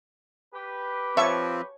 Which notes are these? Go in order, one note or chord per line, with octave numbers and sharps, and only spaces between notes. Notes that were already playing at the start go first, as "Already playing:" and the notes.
G4 B4
F3 C4 C#5 E5 A5 C#6